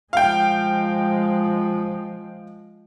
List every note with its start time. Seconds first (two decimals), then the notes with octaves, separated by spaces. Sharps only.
0.13 F3 G#3 F5 G5